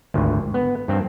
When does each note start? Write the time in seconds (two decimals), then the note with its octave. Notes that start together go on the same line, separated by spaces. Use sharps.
0.14 G#1 D2
0.54 B3
0.88 G2 C4